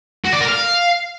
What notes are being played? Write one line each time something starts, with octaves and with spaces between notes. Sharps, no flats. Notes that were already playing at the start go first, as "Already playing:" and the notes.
F#4
D5
A#4
F5